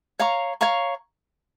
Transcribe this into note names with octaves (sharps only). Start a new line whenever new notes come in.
C#5 F5 A#5 C#6
C#5 F5 A#5 C#6